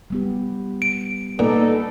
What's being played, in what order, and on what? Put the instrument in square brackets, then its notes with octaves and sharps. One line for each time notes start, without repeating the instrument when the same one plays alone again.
[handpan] G3 B3 G4
[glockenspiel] D7
[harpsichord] A#2 [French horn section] B3 D#4 A4 [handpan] D5